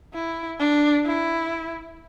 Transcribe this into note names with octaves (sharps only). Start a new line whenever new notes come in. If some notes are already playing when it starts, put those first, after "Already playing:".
E4
D4
E4